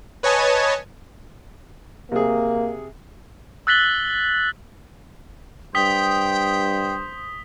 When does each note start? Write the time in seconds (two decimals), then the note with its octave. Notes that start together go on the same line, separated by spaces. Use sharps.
0.23 B4 C#5 D#5 G#5 A5
2.12 C3 A#3 G#4
3.67 E6 F#6 A6 B6 F#7 G7
5.75 G2 C5 G5 D#6 B6 G7